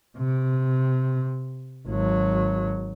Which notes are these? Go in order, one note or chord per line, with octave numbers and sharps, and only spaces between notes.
C3
G#1 F#3